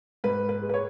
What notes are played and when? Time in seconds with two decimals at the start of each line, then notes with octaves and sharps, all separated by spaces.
0.24 G#2 B4
0.49 B4
0.62 G#3
0.69 B4
0.74 C#5